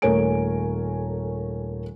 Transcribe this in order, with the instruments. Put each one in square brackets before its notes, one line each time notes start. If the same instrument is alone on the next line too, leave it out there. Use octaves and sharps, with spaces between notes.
[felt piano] D#1 A3 A#4 C#5 G#5 D7